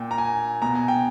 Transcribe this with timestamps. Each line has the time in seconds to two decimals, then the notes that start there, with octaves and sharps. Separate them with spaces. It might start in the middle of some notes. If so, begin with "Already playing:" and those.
Already playing: A#2 G5
0.11 A#5
0.18 G#5
0.62 B2 A#5
0.75 G#5
0.88 G5